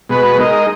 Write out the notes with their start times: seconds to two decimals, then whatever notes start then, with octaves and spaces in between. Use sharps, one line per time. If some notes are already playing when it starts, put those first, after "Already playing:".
0.09 B2 G#3 B3 F#4 B4
0.38 G#3 D#4 A#4 D#5